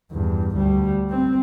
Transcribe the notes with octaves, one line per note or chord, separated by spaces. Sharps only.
E2 G2
D2 G3
C4